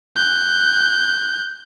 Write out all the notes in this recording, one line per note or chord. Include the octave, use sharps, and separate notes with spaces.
F#6 G6